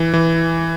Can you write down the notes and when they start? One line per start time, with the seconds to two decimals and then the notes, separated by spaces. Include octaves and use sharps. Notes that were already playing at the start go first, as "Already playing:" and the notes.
Already playing: E3
0.13 E3